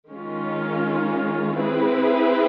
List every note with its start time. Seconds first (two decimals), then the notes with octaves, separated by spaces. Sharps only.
0.10 D#3 G#3 C#4 F4
1.56 C4 E4 G#4 B4